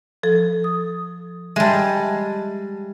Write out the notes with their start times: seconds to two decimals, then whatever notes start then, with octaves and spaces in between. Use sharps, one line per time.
0.23 F3 A4
0.64 D#6
1.56 G3 G#3 E5 A5